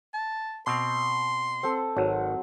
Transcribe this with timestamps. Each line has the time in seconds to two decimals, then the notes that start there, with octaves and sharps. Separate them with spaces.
0.14 A5
0.67 B2 C4 C6
1.63 C4 A4
1.97 G#1 F#3